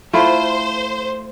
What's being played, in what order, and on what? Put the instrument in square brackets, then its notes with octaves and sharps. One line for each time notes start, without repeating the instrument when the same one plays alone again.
[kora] A3 E4 F4 [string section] C5